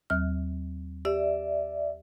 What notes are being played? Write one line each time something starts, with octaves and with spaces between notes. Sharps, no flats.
D#2 F#3 F6
G4 D5 E5